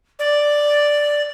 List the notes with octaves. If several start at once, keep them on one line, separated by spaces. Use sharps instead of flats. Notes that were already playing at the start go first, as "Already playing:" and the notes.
D5